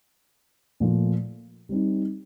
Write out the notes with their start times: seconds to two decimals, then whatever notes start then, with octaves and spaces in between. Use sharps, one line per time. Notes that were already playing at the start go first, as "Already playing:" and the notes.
0.80 A#2 F3 A3
1.69 G3 C4 D#4